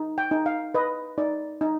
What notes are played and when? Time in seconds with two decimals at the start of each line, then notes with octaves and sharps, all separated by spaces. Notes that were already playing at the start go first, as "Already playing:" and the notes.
Already playing: D#4
0.18 G5
0.31 D#4
0.46 F5
0.74 B4 D#5
1.18 D#4 D5
1.61 D#4